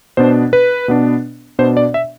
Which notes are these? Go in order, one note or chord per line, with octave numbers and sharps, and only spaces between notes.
B2 B3 D4 C5
B4
B2 B3 D4
B2 B3 D4 C5
D5
E5